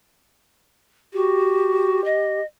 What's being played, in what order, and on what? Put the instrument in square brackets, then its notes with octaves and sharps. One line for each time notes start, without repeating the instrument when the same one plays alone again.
[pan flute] F#4 [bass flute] G4
[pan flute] D#5